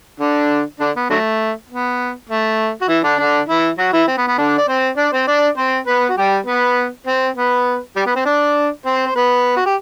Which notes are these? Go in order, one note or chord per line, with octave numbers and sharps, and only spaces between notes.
D3 D4
D3 D4
B3
D3 F#3 A3
B3
A3
F#4
E3 E4
D3 D4
D3 D4
E3 E4
F#3 F#4
E3 E4
C4
B3
B3
D3 D4
D5
C4 C5
D4 D5
C4 C5
D4 D5
C4 C5
B3 B4
F#4
G3 G4
B3 B4
C4 C5
B3 B4
G3 G4
B3 B4
C4 C5
D4 D5
C4 C5
C5
B3 B4
F#4
G4